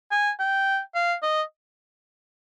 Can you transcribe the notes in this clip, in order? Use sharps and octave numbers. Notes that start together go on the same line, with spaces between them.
G#5
G5
F5
D#5